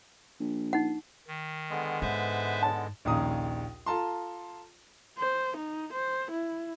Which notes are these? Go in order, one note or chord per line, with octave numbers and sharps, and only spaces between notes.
A#1
D#4 F#5
D#3
D3 G#3 B3
G#2 B4 C5 E5
A5
A#1 D#2 C#3 A#5 D#6
F4 A4 A5 A#5 C6
C5
D#4
C5
E4